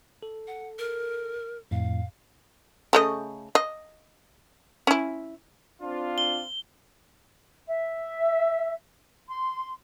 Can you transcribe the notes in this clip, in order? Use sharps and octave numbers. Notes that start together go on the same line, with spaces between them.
A4
F#5
A#4
F2 A2 F5
C#3 A3 D#5
D#5
C#4 E4
C4 D4 F4
G7
E5
C6